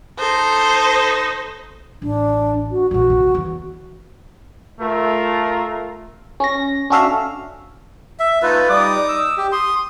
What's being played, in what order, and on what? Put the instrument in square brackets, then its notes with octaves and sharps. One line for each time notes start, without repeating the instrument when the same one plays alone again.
[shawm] D#4 [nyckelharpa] A4 [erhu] C5
[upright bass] A1 [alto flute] D4
[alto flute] F#4
[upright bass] A#1 E2 [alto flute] F#4
[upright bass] C3
E2
[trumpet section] A3 F4 A#4
[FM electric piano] C#4 A#6
C#4 D4 F#4 A4 E5 F5
[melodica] E5
[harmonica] A3 D#4 [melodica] F4 B4
[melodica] G3 [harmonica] D#4 D6 D#6
[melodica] E6
G4
[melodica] C6 [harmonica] D#6